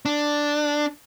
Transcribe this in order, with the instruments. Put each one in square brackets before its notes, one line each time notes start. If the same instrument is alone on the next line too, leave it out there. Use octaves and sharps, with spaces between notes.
[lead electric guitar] D4